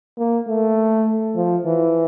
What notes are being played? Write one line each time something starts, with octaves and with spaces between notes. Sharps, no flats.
A#3
A3
F3
E3